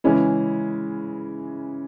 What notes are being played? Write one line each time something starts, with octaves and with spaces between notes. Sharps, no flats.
C#3 E3 G#3 C#4 E4